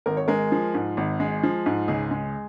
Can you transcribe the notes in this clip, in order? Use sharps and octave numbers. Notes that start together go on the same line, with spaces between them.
G#1 A#4
C#5
G#3 A#4
F3
G#2
G#1
G#3
F3
G#2
C#2 G#4
G#3